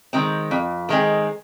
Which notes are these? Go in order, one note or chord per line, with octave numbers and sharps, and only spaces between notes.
D#3 G#3 C4
F2
D#3 G#3 C4